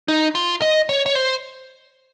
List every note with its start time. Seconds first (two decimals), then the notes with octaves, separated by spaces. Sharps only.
0.08 D#4
0.35 F4
0.62 D#5
0.89 C#5
1.06 C#5
1.15 C5